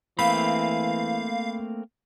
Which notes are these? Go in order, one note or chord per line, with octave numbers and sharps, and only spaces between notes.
E3 A3 A#3 C4 F5 B5